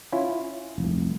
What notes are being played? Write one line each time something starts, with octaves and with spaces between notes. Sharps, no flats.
C#4 E4 F4
F1 C2